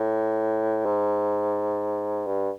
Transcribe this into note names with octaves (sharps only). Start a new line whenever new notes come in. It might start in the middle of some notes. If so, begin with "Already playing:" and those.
Already playing: A2
G#2
G2